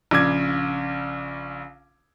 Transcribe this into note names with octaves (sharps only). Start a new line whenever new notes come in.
A#1 C#3 D6 G#6